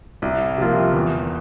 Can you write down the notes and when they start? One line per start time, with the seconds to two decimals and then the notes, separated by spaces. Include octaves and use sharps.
0.22 C2
0.58 C3 F3 A#3 F4
0.94 E2